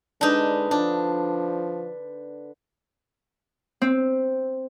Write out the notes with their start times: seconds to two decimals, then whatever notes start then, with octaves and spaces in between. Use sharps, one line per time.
0.21 D3 G#3 D4 D#4 B4 C5
0.71 F3 D4
3.82 C4